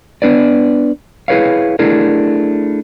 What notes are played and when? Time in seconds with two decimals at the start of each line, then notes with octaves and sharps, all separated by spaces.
0.22 B3 D4 B4 D5
1.28 E4 G#4 B4 C#5 F5
1.79 A3 D4 E4 G#4 A#4